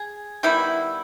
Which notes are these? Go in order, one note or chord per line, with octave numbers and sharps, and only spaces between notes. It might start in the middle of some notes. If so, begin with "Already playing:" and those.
Already playing: G#4
D#3 G3 B3 E4